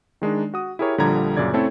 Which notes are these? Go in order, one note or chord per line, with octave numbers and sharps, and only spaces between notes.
D#3 G#3 D4 D#4
F#4 D#6
E4 G4 G#4 A#4 C#5
A#1 D3 F3 G3 A#5 G#6
F#2 A#2 C#3 D5 G#6
A3 C4 C#4 E4 A4 C#5